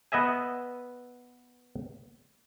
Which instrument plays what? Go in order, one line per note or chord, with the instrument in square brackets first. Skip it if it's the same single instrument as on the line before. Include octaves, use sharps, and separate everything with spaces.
[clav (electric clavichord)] B3 B4 D#5 E5 G#5